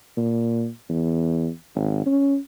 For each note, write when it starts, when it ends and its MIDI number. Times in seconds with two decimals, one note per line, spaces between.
0.17 0.67 46
0.89 1.49 40
1.75 2.02 32
2.06 2.36 61